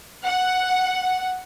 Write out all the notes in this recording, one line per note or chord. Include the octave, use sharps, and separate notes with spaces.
F#5